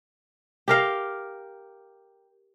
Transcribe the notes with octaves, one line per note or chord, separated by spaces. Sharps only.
G4 A#4 F5